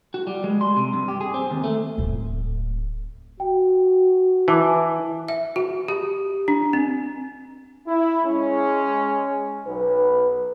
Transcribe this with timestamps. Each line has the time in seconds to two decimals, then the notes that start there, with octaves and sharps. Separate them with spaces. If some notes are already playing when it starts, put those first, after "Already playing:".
0.14 F#4
0.27 G3
0.44 G#3
0.61 C6
0.76 C3
0.93 G2
1.08 G4
1.21 G#4
1.34 C4
1.51 D#2
1.64 A3
1.98 D1 C4
3.40 F#4 G5
4.48 E3 G#5 A5 D6
5.28 E5
5.56 F#4
5.88 G4
6.48 D4
6.73 C4
7.87 E4
8.25 G#3 C#4
9.67 B1 B4